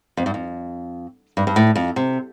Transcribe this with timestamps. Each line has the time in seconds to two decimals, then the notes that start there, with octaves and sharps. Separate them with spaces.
0.17 F2
0.26 G2
0.34 F2
1.37 G2
1.47 G2
1.56 A2
1.76 F2
1.96 C3